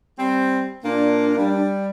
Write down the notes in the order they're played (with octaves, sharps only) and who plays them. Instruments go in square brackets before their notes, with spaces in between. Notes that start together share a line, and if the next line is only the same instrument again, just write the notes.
[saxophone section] G3 C4
[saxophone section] A#2 A#3 [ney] D4
[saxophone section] G3